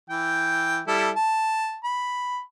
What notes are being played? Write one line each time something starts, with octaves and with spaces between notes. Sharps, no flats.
E3 G5
G3 E4 A4
A5
B5